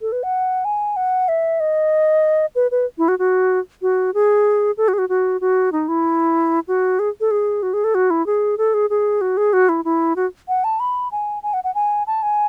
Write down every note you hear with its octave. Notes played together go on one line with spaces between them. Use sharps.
A4
B4
F#5
G#5
F#5
E5
D#5
B4
B4
E4
F#4
F#4
F#4
G#4
A4
F#4
G#4
F#4
F#4
F#4
D#4
E4
F#4
G#4
A4
G#4
F#4
G#4
A4
F#4
E4
G#4
A4
G#4
G#4
F#4
G#4
F#4
E4
E4
F#4
F#5
A5
B5
G#5
G#5
F#5
F#5
G#5
A5
G#5